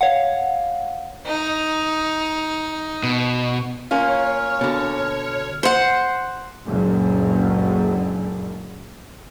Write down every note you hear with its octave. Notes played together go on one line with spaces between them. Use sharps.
C#5 F5 F#5
D#4
B2
A#3 C#4 F4 C#5 F6
B2 D3
C5 F#5
F#1 C#2 F#2 A#2 D3